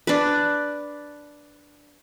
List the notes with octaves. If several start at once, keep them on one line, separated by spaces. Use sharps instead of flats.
D4 B4